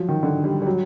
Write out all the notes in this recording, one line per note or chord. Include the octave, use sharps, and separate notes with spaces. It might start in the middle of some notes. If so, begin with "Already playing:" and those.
Already playing: F3 F#3
D#3
D3
G3
G3
F#3